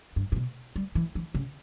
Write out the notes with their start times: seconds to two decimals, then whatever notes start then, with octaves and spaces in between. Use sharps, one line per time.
0.16 G2
0.32 A2
0.36 B2
0.76 G3
0.95 E3
1.15 E3
1.34 C#3